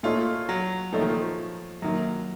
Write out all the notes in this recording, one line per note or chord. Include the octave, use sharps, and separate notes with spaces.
A#2 A3 D#4 F4 A4 C#5
F#3
A#2 F3 A3 D#4 A4 C#5
D#3
F3
F#2 D#3 F#3 A#3